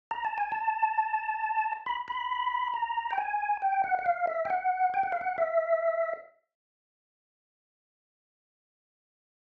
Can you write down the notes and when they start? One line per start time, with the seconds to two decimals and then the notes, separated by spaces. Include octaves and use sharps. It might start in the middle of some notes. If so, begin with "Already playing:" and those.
0.11 A#5
0.25 A5
0.38 G#5
0.52 A5
1.86 B5
2.08 B5
2.74 A#5
3.11 G5
3.18 G#5
3.62 G5
3.84 F#5
3.99 F#5
4.06 F5
4.27 E5
4.45 G5
4.50 F#5
4.94 G5
5.03 F#5
5.12 F5
5.21 F#5
5.38 E5